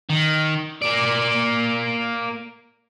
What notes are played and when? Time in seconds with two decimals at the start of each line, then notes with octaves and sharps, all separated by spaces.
0.10 D#3
0.82 A#3 D5